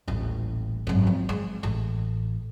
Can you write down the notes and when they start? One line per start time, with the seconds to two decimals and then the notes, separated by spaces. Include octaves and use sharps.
0.08 D#1 A1
0.87 G#1 F#2
1.07 F3
1.29 G#3
1.63 A1